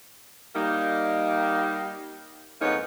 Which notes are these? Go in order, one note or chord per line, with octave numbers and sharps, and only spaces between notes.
G3 A#3 D#4
F2 G#2 A#3 B3 D#4 C#5